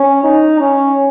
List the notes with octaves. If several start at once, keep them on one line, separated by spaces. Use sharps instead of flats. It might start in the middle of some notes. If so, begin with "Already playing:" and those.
Already playing: C#4
D#4
C#4